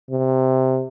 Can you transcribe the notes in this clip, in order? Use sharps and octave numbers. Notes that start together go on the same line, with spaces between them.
C3